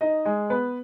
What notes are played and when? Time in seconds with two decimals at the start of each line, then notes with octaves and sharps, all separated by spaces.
0.01 D#4 D#5
0.25 G#3 G#4
0.50 B3 B4